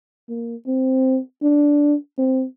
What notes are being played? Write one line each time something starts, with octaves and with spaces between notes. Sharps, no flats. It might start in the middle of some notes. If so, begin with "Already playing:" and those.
A#3
C4
D4
C4